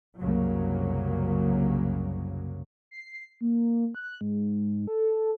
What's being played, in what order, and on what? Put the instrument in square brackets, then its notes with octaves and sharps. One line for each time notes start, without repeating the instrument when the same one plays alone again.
[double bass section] C2 F#2 C#3 F#3 A#3
[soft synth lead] C7
A#3
F#6
G#2
A4